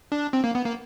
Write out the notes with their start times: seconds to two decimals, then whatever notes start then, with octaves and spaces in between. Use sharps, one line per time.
0.12 D4
0.33 C4
0.44 A#3
0.55 B3
0.66 A#3